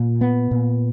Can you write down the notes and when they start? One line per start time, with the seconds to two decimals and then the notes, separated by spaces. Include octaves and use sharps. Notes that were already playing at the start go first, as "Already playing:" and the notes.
Already playing: A#2
0.21 B3
0.51 A#2